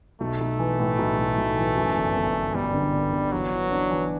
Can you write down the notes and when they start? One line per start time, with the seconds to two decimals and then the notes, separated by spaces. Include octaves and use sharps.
0.20 B1 A3
0.41 B1
0.59 E3
0.80 A2
0.98 B1
1.18 B1
1.37 B1
1.58 E3
1.76 F#2
1.96 G1
2.16 G1
2.35 G1
2.54 G1 G3
2.74 D3
2.93 G1
3.13 G1
3.32 E3 F#3
3.52 E3
3.71 D4
3.90 E3